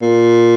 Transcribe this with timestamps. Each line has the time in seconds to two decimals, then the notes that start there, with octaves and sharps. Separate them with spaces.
0.01 A#2